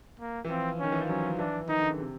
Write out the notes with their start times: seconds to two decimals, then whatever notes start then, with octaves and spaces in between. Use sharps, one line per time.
0.20 A#3
0.45 E3
0.49 F3 C4
0.79 D#3 C#4
0.92 E3
1.01 F3
1.09 F#3 C#4
1.25 F3
1.38 E3 D4
1.68 D#3 D#4
1.79 D3
1.88 C#3
2.00 C3